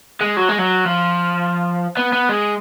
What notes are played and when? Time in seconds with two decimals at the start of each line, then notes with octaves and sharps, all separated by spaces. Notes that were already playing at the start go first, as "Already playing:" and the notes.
0.21 G#3
0.37 F#3
0.49 G#3
0.59 F#3
0.85 F3
1.97 B3
2.13 B3
2.29 G#3